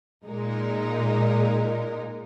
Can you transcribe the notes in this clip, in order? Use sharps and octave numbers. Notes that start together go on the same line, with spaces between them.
A#2 G#3 D#4 A#4